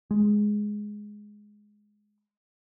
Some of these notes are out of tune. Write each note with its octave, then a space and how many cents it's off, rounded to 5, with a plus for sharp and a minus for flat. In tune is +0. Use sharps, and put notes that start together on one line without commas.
G#3 +5